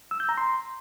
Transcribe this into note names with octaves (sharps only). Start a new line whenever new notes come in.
E6
G6
A#5
C6